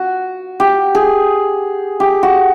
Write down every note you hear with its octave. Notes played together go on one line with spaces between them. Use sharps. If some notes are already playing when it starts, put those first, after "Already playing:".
Already playing: F#4
G4
G#4
G4
F#4